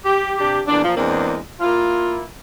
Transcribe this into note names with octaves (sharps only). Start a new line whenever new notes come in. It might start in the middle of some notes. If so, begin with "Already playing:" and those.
G4
C3 D4 G4
E2 A#2 D4
A#2 F3
E2 G#3 A#3 C4 D4
A#3 E4 F4